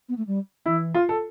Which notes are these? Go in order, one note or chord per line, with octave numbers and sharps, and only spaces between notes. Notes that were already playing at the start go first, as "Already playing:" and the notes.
B3
A3
G3
E3 E4
F4
A4